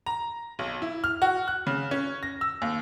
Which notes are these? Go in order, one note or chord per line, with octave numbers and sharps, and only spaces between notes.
A#5
B1
E4
F6
F#4
F#6
C#3
C#4
A#6
E6
D#2